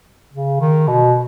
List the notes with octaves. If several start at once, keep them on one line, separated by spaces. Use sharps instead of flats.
C#3
D#3
B2